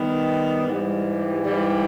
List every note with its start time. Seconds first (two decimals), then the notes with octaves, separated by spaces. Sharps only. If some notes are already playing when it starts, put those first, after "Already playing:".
Already playing: D#3 G3 B3
0.67 G#2 E3 G3
1.43 G#2 E3 G3